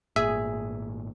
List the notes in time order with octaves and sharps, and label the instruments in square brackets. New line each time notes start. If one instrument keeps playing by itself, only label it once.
[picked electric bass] G#1 A#2 [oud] G#4 [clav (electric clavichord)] E5